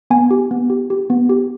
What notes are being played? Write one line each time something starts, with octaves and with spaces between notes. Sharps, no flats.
B3 G#5
G4
B3
G4
G4
B3
G4